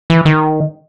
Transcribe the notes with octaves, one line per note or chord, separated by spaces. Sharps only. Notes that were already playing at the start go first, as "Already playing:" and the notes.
E3
D#3